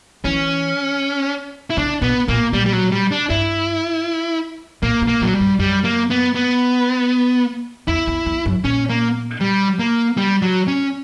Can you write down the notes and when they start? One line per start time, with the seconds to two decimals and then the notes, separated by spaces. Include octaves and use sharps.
0.24 E3 C#4
1.70 E4
1.77 C#3 D4
2.02 B2 B3
2.28 A#2 A#3
2.53 A#2 G3
2.66 G3
2.73 F#3
2.92 G3
3.11 D4
3.30 G2 E4
4.83 A#2 A#3
5.02 B2
5.07 A#3
5.21 A#2 F#3
5.34 G3
5.40 G2
5.59 F#2 G3
5.84 A#3
6.10 B3
6.35 B3
7.88 E2 E4
8.07 E2
8.26 E2
8.46 F#2
8.64 A#2 C#4
8.89 A#3
9.41 G3
9.79 A#3
10.17 G3
10.42 F#3
10.68 C#4